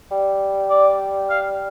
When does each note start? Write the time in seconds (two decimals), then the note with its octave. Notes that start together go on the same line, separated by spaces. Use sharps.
0.11 G3
0.70 D5
1.30 F5